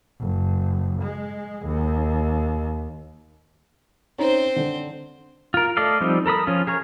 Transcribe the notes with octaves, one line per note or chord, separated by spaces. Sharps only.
F#1
G#3
D#2
C4 C#4 D#4 C5 A#5
D3
F4 A#4
A3 A4 D5 D#5 F5
F3 G3 C4 D#4
A4 A#4 B5 D#6
F3 C#4 F4
G#4 A#4 C#5